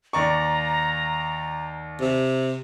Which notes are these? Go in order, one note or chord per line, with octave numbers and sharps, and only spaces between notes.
D#2 D5 A#5 C#6
C3